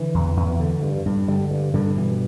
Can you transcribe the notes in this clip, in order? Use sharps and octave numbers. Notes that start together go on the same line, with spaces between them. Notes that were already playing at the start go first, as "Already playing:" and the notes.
Already playing: D3 E3
E2
E2
D3
G2
G2
D3 G3
G2
G2 D3
B2 E3